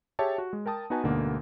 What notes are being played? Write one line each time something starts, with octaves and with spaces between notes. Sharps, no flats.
G4 G#4 C#5 E5 G5 A5
F#4
G#3
A#4 G5 A5 D#6
B3 D#4 F#4 B4 G#5 A5
D2 G#2 B2 D3 A#3